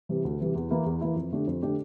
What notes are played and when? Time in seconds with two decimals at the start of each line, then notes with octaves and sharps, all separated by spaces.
0.09 C3 E3 G3
0.25 D2
0.40 C3 E3 G3
0.55 E2
0.71 E3 A#3 E4
0.86 E2
1.01 E3 A#3 E4
1.16 F2
1.32 D3 A3 D4 G4
1.47 F2
1.62 D3 A3 D4 G4